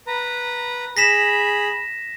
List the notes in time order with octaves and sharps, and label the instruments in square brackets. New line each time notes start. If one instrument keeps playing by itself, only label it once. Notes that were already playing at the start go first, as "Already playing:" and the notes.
[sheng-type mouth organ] B4 A#5
[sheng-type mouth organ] G#4 B5 [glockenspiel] A#6 B6 E7